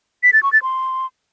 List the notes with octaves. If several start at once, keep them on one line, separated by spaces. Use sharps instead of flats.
B6
A6
C#6
A6
C6